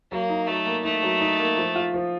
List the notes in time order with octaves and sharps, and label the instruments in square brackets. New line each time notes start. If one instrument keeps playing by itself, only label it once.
[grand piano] F#3 [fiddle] A#3
[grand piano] D#4
[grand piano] F#3 [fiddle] A3
[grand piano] A#3
[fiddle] A3 [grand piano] D#4
[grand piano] F#3
D#4
A#3
F3
F4
F3